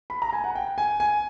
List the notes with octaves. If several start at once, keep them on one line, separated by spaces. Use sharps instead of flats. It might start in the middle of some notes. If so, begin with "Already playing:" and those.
B5
A#5
G#5
F#5
G5
G#5
G#5